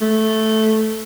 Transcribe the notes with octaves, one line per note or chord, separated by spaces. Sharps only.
A3